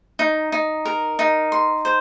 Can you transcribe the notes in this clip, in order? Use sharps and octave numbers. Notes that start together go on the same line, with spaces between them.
D#4
D#4
A#4
D#4
C6
C5